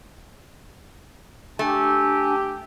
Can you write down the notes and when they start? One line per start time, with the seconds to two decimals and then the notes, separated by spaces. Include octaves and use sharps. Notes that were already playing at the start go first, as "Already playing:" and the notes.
1.59 A3 D4 G4 G#5